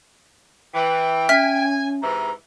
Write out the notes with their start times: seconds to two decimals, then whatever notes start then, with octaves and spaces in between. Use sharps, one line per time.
0.74 E3 G5
1.29 C#4 E5 G#5 F6 B6
2.02 G#2 C3 E3 A#5